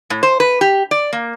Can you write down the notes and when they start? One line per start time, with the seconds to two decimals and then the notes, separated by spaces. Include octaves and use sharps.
0.10 A2
0.23 C5
0.40 B4
0.61 G4
0.91 D5
1.13 A#3